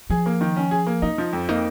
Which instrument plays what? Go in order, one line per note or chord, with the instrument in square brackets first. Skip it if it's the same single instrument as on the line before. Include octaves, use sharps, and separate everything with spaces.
[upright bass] F3 [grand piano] G#4
[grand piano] A#3
D#3
C#4
G#4
A#3
[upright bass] C#4 [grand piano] D#4
[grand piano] F3
F2
[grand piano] A#3 [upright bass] D#4